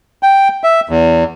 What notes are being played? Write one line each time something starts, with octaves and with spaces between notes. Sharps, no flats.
G5
E5
E2